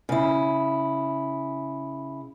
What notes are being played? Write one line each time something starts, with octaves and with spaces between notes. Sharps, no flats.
C#3 E4